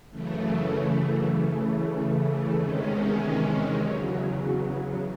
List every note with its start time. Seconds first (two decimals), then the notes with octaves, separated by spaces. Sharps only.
0.11 F#2 C#3 E3 A3
1.33 C#3 E3 A3
2.54 E2 C3 D#3 G#3 C#4
3.77 E2 C#3 F#3